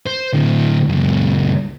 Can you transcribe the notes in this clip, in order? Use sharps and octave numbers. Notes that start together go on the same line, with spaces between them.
C5
D2 A2
C#2 F#2